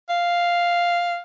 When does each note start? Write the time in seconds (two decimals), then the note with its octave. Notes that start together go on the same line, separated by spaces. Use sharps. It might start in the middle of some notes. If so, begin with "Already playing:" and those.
0.09 F5